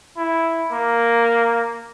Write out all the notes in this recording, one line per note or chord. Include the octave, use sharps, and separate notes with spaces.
E4
A#3